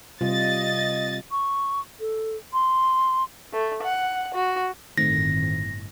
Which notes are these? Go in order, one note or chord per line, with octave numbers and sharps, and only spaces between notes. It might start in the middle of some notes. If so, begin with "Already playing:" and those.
C3 G3 F4 D#5 A6
C#6
A4
C6
A3
F#5
F#4
G1 A2 D#3 A3 C4 A#6